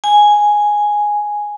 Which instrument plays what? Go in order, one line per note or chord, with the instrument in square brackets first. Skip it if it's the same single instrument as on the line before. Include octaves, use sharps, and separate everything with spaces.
[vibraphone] G#5